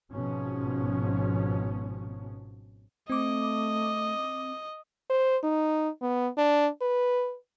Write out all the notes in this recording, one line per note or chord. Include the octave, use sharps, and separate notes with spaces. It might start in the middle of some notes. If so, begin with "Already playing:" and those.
G#1 G#2 B2 F3 C#4
A3 C4 D#5 D6
C5
D#4
B3
D4
B4